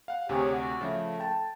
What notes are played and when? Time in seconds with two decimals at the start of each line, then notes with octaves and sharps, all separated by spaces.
0.08 F5 F#5
0.29 D2 C3 G4 G#4 C#5
0.49 F#4 D5
0.81 C#3 F3 A3
1.20 G5 A5